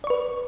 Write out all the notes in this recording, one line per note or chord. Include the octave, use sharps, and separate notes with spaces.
B4 D5 C#6